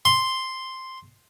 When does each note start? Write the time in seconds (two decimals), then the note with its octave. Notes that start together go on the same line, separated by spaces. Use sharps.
0.05 C6